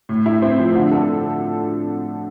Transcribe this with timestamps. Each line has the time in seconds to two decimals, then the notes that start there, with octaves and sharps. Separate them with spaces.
0.09 A2
0.26 E4
0.42 C4
0.58 F3
0.75 D3
0.92 A4